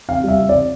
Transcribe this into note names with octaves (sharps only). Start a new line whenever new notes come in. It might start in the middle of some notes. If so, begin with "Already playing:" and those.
C3 F5
G3 E5
C3
D5
C3